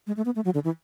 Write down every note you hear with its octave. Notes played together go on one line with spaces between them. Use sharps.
G#3
A3
B3
A3
F#3
D3
E3